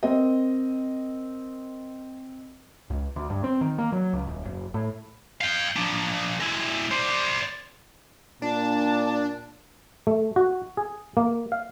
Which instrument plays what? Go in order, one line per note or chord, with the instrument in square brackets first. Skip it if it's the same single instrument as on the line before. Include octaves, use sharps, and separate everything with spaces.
[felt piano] C4 A#4 D#5
[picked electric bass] C#2
D2
G2
C4
D#3
A#3
F#3
C#2
D#1
F#1
A2
[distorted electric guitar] F5 G5
F3 D4
G#3 E4
C5 D5
[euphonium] A#2 [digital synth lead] D4 [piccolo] A5
[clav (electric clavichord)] A3
F#4
G#4
A#3
F5